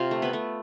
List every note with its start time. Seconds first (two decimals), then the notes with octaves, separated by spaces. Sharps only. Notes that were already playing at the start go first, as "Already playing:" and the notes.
Already playing: C3 F4 F5
0.11 A3
0.22 B3 B4
0.33 A3